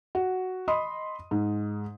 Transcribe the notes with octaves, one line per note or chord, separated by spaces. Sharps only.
F#4
D#5 B5 C6 D#6
G#2